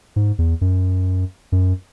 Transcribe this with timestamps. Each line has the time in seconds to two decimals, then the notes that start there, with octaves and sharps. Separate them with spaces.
0.16 G#2
0.38 E2
0.61 F#2
1.52 F#2